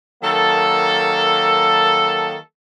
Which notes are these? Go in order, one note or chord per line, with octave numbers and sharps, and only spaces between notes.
D#3 F#3 A#3 A4